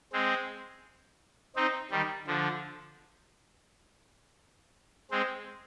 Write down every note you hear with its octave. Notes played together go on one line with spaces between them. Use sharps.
G#3 C4
C4 D#4
D#3 G3
D3 F3
G#3 C4